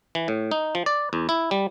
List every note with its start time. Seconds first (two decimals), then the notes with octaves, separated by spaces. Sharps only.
0.15 E3
0.28 A2
0.51 D#4
0.75 F3
0.86 D5
1.13 E2
1.29 E4
1.51 G3